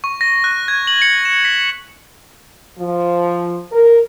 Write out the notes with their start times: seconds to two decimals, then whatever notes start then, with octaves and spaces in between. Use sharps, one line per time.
0.04 C#6
0.21 A#6
0.44 F#6
0.68 G#6
0.87 F#7
1.02 C#7
1.25 E7
1.45 B6
2.78 F3
3.71 A#4